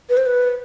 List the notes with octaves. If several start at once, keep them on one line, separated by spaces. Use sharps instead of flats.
B4
C5
B4